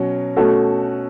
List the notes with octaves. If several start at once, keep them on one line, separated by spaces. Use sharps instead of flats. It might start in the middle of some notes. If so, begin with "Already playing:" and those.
Already playing: B2 F#3 C#4
B2 A3 C#4 F#4 A4